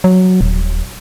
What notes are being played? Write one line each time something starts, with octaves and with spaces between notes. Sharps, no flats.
F#3
D#1